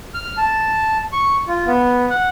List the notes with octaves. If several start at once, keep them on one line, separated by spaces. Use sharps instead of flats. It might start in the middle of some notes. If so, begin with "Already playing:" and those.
F6
A5
C#6
F4
B3
F#5